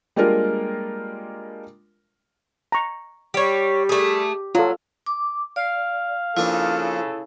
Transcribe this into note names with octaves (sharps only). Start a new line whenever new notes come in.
G3 G#3 A#3 D4 F4 A#4
A#5 C#6
G3 G4 C#5
A3 G#4
F#3 F4 A4
D6
D5 F5
C#3 F3 A#3 D4 E4 A4